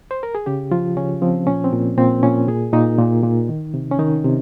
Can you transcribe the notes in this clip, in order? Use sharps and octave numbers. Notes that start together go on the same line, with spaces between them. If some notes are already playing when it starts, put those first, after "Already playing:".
C5
A#4
G#4
C#3 G4
F3 F4
C#3 C#4
F3 C4
A#2 C#4
C4
A#2
A#2 C4
A#2 C#4
A#2 G#4
A#2 D#4
A#2
A#2
D#3
C3
C#4
D#3 D#4
C3